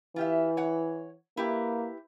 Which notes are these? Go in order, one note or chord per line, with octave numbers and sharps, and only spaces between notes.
E3 F4 G4 E5
C#5 F#5
A#3 E4 G4 B4